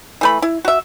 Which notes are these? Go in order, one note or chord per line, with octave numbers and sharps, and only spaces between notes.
E3 A3 B5
E4
F#4 E5